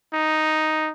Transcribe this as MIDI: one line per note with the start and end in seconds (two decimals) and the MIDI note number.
0.13 0.91 63